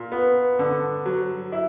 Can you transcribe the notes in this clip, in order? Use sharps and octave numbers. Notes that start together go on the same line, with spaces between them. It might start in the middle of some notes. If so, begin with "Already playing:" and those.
Already playing: A#2
B3
D3
F#3
E4